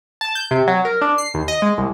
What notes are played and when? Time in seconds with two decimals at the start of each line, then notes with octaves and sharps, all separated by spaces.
0.21 A5
0.35 G6
0.51 C3
0.67 F#3
0.85 A#4
1.01 D4
1.18 C7
1.34 D#2
1.48 D#5
1.62 G#3
1.78 C2